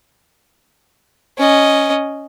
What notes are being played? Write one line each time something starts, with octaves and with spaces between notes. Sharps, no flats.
C#4 D#5